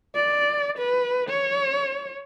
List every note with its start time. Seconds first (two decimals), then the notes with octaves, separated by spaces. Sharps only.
0.15 D5
0.78 B4
1.29 C#5